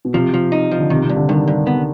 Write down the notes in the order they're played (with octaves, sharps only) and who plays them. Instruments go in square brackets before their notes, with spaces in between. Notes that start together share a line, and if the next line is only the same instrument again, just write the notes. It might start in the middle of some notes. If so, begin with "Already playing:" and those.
[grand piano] B2
[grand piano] C3 [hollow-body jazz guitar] F3
[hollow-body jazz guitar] F3
D#4
F3
[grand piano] D3
[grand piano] C3 [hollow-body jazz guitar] D#3
[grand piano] C3
[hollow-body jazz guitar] G2
[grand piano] D3
[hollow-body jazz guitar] G2 [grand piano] D#3
[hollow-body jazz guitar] G2
B3